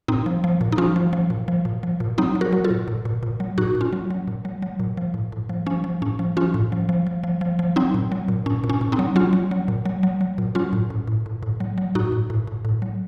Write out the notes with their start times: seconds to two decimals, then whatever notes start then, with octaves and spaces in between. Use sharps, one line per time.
0.08 A#2 C4 D#4
0.26 F3
0.44 F3
0.61 A#2
0.72 D#4
0.78 F3 C#4 F4
0.96 F3
1.13 F3
1.30 A#2
1.48 F3
1.65 A#2
1.83 F3
2.00 A#2
2.18 F#3 C4 D#4
2.35 F#3
2.41 F#4 A#4
2.53 F#3
2.64 F4 A4
2.70 A#2
2.88 A#2
3.05 A#2
3.23 A#2
3.40 F#3
3.58 A#2 D#4 F#4
3.75 A#2
3.81 C#4 F4
3.93 F#3
4.10 F#3
4.28 A#2
4.45 F#3
4.62 F#3
4.80 A#2
4.97 F3
5.14 A2
5.32 A2
5.49 F3
5.66 F3 C#4
5.84 F3
6.02 A2 C#4
6.19 F3
6.37 F3 C#4 F4
6.54 A2
6.72 F3
6.89 F3
7.07 F3
7.24 F3
7.41 F3
7.59 F3
7.76 F#3 C4 D#4
7.94 A#2
8.12 F#3
8.28 A#2
8.46 A#2 C#4
8.64 A#2
8.70 C#4
8.81 A#2
8.92 C4 D#4
8.99 F#3
9.16 F#3 C#4 F4
9.33 F#3
9.51 F#3
9.68 A#2
9.86 F#3
10.03 F#3
10.21 F#3
10.38 A#2
10.55 F#3 C#4 F4
10.73 A2
10.90 A2
11.07 A2
11.26 A2
11.43 A2
11.60 F#3
11.78 F#3
11.95 A2 D#4 F#4
12.12 A2
12.30 A2
12.47 A2
12.65 A2
12.82 F#3